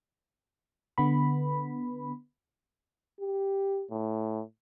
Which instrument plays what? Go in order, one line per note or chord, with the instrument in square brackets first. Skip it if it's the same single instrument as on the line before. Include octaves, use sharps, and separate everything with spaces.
[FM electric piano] D3 B3 B5
[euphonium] G4
A2